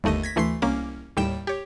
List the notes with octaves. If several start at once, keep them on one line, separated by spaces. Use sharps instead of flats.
G1 D#2 A3 D#5 D#7
G#6 A#6 B6
D2 E3 A3 C6 B6 C7
C2 A#3 C#4 D6
D#2 A2 G3 G5 E7
G4 C#5